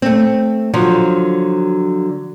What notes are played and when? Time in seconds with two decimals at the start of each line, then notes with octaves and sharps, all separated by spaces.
0.02 A3 C4
0.74 D3 F3 F#3